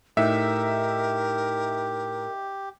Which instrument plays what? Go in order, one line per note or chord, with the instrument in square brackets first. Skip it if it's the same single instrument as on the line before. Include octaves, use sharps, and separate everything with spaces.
[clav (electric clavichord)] A2 [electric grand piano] D#4 E5 [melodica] G4 [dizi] A#4